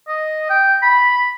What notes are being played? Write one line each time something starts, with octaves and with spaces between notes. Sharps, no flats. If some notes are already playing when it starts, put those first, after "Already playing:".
D#5
G5
B5